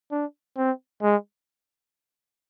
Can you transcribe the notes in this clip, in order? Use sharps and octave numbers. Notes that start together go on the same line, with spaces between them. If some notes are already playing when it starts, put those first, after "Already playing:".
D4
C4
G#3